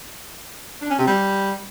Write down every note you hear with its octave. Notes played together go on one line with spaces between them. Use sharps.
D4
C#4
C3
G3